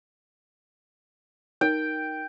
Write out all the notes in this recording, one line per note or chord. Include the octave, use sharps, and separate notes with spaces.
D#4 A#4 G5